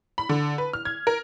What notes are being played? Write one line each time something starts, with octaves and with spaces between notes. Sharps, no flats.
B5
D3
B4
F6
G#6
A#4